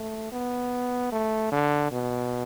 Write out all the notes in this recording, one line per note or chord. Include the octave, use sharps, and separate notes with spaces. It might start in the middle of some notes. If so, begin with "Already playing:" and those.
Already playing: A3
B3
A3
D3
B2